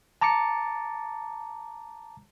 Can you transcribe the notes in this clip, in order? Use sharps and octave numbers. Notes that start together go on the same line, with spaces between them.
A5 A#5 D6 A6 C#7